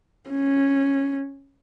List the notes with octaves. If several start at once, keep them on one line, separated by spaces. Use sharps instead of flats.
C#4